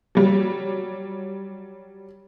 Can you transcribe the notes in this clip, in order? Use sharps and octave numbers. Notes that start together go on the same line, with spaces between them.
F#3 G3